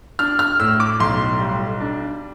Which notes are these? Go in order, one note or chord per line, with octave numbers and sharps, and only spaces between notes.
D4 F6
F6
A2 E6
D6
B1 C6
G3
D4